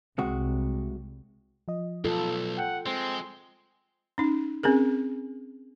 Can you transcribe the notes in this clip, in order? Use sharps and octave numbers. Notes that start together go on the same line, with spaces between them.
C2 C3 G#3 F#4
F3 D#5
B1 F4 A4
F#5 G5 G6
G#3 C4 C6
C#4 D#4
C4 C#4 G#4 A#4